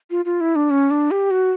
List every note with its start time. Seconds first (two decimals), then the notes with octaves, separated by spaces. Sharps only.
0.11 F4
0.25 F4
0.41 E4
0.56 D4
0.70 C#4
0.91 D4
1.11 G4
1.31 F#4